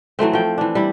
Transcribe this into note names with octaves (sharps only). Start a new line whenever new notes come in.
E3 F#3 A3 C4
F3 G5
E3 D4
G3 E4